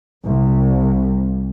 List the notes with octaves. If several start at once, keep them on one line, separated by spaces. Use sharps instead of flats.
C2